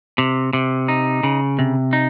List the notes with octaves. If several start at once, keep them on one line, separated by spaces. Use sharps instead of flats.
C3
C3
D#4
C#3
C3
D#4